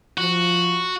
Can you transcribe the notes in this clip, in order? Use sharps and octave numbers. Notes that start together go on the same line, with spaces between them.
F3 F#4